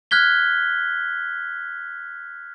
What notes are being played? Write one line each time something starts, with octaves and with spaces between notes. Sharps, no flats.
F6 F#6 G#6 B6 G7